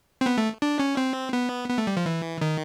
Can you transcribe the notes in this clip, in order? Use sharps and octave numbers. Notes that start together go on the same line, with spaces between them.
C4
B3
A3
D4
C#4
C4
B3
B3
A3
G3
F3
E3
D#3